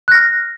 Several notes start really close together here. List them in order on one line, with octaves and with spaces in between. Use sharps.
F#6 A#6 F6